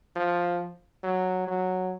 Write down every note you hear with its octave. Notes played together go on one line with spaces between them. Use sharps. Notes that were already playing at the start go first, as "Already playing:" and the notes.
F3
F#3
F#3